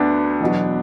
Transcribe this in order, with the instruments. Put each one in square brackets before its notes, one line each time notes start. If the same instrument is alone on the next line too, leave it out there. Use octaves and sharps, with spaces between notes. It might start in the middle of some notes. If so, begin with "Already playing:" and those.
Already playing: [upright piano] D2 [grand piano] B3 D4
[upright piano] E2 B2 F#3